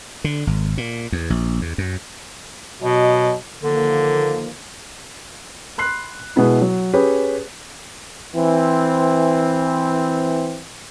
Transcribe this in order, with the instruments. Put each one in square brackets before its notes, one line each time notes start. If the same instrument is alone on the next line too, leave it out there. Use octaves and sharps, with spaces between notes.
[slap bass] D3
G#1
A#2
E2
A#1
E2
F#2
[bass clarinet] B2 [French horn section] F#3 B3 D#5
[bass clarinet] D3 [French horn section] D#3 F3 A#3
[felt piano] B5 C6 F#6 C7
B2 G#3 B3 E4
F#3
C#4 G4 G#4 B4
[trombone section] E3 C4